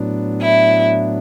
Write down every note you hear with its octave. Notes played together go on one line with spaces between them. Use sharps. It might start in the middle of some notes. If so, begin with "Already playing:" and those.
Already playing: A2 F#3 B3 D4
E4